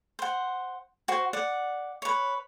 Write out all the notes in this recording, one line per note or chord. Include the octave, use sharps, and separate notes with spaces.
C5 F#5
F#4 C5
D5 F#5
B4 C#5